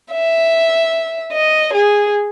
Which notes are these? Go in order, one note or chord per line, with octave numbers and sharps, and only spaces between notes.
E5
D#5
G#4